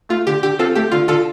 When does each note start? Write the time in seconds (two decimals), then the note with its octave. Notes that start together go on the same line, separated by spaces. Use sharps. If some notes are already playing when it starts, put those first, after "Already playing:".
0.09 A3 F4
0.27 D3 G4
0.43 D3 G4
0.59 C4 F4 A4
0.75 A3 G4
0.91 D3 F4
1.08 D3 F4 A4